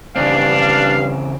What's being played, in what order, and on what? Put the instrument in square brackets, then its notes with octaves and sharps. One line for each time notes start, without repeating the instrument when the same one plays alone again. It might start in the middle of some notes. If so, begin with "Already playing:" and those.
[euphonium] G2 [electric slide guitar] C#3 E3 C4 [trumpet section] D4 [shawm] F5